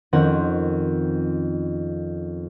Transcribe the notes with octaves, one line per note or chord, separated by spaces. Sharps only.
F2 D#3 C4 C#4 F#5